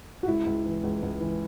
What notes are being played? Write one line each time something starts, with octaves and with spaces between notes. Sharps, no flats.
F#4
C#2 E4
C#2
E3
C#2
C#2
E3